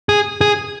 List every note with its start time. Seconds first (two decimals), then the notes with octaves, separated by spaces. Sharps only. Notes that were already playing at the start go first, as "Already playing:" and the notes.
0.09 G#4
0.41 G#4